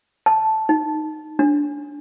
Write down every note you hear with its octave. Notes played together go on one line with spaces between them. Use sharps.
A5
D#4
D4